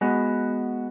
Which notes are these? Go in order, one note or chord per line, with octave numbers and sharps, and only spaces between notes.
G#3 B3 F#4